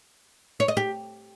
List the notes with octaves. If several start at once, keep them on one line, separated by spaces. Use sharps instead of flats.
C#5
D#5
G4